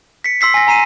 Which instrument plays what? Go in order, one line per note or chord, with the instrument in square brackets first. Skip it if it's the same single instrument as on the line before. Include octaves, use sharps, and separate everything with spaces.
[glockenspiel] B6 C#7
C6 E6 B6 C7
G#5 A#6
G#5 A#5 C7 D#7